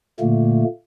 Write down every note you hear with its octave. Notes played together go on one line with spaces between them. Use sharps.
A#2 D3 A3 A#3